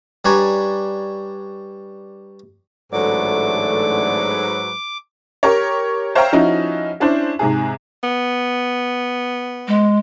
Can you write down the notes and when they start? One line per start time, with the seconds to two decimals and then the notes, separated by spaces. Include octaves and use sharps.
0.25 G3 D4 B4 C#5 G#5 A#5
2.93 A1 G#2 D3 F#3 A3 A4 B4 D6
5.43 G4 A#4 C#5
6.15 C5 C#5 E5 F5 G5 A#5
6.32 F3 C#4 D#4 E4 F#4
7.00 C#4 D4 E4 C5
7.39 G#2 C3 G#4
8.03 B3
9.68 G#3